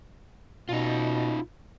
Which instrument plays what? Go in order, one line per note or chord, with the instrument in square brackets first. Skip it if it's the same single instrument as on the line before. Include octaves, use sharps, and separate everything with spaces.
[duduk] B2 [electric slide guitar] D#4 F4